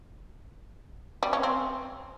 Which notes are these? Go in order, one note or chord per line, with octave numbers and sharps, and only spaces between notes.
G3
C#4
C4